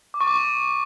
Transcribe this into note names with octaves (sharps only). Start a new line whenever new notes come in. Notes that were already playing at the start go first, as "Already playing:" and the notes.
D6
C#6
D6